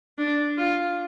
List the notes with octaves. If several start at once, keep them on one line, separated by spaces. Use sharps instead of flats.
D4
F4